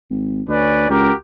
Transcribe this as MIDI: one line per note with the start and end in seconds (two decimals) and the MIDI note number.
0.11 0.42 32
0.48 0.88 38
0.48 0.87 61
0.48 0.87 71
0.48 0.87 74
0.89 1.11 37
0.89 1.12 66
0.89 1.12 67
0.89 1.12 70